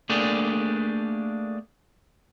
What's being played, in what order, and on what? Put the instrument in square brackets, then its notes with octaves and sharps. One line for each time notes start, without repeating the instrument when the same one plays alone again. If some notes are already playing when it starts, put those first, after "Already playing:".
[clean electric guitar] A3 A#3 D4 G4 G#4 D5